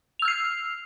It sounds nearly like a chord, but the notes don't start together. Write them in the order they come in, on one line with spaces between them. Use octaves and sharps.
F7 E6 F6 C7